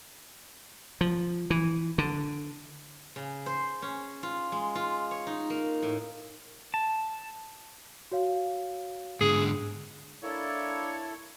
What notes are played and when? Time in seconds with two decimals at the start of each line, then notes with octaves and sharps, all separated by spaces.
1.01 F3
1.50 E3
1.98 D3
3.16 C#3
3.46 C5
3.82 C#4
4.23 F4
4.52 G#3
4.75 F4
5.11 C#5
5.27 D#4
5.50 A#3
5.82 A2
6.74 A5
8.12 F#4 C#5 F5
9.21 G#2 D3 G#4
10.23 A#3 D4 E4 A4 C#5 D5